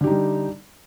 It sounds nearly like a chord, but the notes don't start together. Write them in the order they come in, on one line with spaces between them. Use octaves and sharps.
D3 G4 D#4 G3